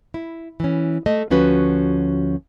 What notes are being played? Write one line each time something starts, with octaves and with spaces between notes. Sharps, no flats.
E4
E3 C#4
A3 D#5
D2 F3 C#4 F#4 B4